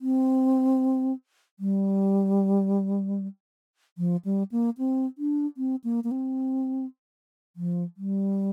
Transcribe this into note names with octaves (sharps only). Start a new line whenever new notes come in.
C4
G3
F3
G3
A#3
C4
D4
C4
A#3
A#3
C4
F3
G3